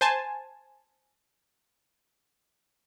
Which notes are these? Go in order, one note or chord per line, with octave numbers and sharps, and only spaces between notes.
C5 G#5 A5